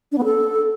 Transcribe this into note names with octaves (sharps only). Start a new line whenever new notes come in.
D4
B3
A4